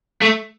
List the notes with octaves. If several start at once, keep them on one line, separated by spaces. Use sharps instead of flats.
A3